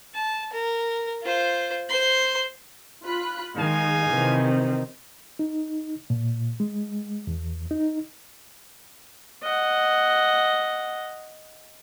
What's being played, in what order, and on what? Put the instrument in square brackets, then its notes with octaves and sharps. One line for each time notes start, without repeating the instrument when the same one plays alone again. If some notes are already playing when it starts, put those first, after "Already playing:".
[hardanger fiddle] A5
A#4
F4 C5
C5 C6
[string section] F4 B5 F#6
[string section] D#3 G#3 [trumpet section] D#4 F5 G#5
[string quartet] C3 D#3 C4 [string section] E3
[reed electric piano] D#4
A#2
G#3
E2
D#4
[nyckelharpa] D#5 F#5